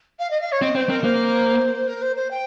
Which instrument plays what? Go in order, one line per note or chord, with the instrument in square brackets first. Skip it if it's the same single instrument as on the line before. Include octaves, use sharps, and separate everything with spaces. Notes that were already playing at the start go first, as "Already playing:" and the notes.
[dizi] F5
D#5
F5
C#5
[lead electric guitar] C4 [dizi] D#5
[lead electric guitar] C4 [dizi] C5
[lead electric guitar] C4 [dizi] A#4
[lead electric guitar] A#3 [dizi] C5
[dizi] A#4
C5
C5
G5